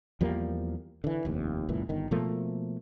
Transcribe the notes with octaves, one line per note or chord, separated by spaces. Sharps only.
E2 F3 G3 A#3
D3 E3
F1 D#2
F#1 C#2 A#2 E3
G1 D#3
B2 F3 A3 A#3